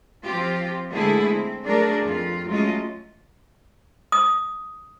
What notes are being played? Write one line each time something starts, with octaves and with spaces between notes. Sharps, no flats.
F3 C4 F4 G4
D3 G#3 A3 B3 E4 G#4
C4
F#3 A3 D4 G#4 A#4 D5
F2 F4
F#3 G#3 A3 C#4 F4 D#5
D#6